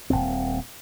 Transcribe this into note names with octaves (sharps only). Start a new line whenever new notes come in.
D#1 G#1 A#2 C4